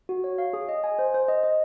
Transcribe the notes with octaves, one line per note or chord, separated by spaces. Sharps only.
F#4
C#5
F5
G#4
D#5
G#5
C5
C5
D#5
D#5